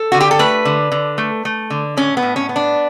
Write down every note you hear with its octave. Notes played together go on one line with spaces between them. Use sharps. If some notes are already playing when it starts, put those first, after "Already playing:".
Already playing: A4
D3 F#4
G4
A4
A3 B4
D3
D3
A3
A3
D3
A2 C#4
B3
A2
C#4
B3
D4